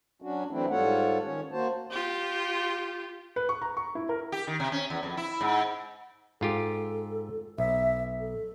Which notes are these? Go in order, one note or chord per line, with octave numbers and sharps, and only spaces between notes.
F#3 C#4 D4 F#4
E3 F#3 A3 C4 D4 E4
G#2 G3 F4 A4 C#5 F#5
D#3 C#4 C#5
A#3 F#4 C5 A5
F4 G4
B4
C#6
A#5
C#6
E4
A#4
G4
D#3
C3
C#4
E2
F2
E4
G#2
G#2 F4 G4 A4
B1 E5
A4